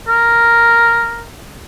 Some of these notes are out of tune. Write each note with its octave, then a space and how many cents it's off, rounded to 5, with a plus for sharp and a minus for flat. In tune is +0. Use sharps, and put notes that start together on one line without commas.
A#4 +0